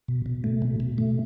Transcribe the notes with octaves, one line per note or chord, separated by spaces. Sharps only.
B2
B2
A3
B2
B2
A3